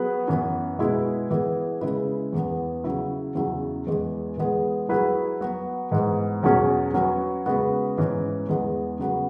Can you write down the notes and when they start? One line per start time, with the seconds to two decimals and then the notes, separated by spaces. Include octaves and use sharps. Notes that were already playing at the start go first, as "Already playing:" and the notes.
Already playing: F#3 B3 G#4 B4
0.28 F#2 E3 B3
0.79 B2 G#3 E4 B4
1.30 E3 B3 E4 G#4
1.81 C#3 G#3 E4 B4
2.33 E2 E3 B3
2.84 C#3 F#3 E4
3.35 E2 C#3 F#3 E4
3.87 E2 E3 G#3
4.37 E3 G#3 B3 G#4
4.89 F#3 E4 G#4 B4
5.41 F#3 B3 F#4
5.91 G#2 E3 B3
6.43 E2 B2 F#3 C#4 G#4
6.94 F#3 C#4 F#4 B4
7.46 C#3 G#3 B3 F#4 B4
7.97 G#2 E3 C#4
8.48 E2 E3 G#3 B3
8.99 C#3 F#3 B3 F#4 B4